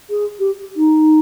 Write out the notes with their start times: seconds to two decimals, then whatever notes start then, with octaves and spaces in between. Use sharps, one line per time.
0.10 G#4
0.39 G4
0.77 D#4